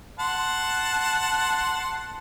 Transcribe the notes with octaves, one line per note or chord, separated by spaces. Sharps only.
F#5 A5 C6